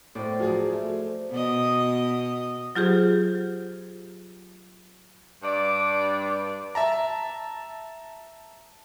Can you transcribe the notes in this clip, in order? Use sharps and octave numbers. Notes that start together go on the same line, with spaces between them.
A2 C5 D5
F3 F#3 G#4
A3
B2 D#5
F#3 F4 G4 G#4 C5
G2 D5
E5 A5 A#5